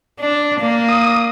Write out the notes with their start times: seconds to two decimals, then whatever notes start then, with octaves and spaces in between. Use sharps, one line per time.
0.20 D4
0.60 A#3
0.89 D#6